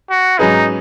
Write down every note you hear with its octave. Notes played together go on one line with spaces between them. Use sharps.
F#4
G#2 F#3 C#4 D#4 G#4 B4